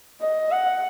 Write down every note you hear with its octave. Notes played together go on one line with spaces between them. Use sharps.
D#5
F#5